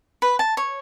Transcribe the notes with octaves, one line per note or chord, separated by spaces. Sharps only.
B4
A5
C#5